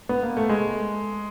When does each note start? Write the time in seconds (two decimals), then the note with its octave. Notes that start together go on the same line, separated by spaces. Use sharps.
0.09 B3
0.23 A#3
0.37 A3
0.49 G#3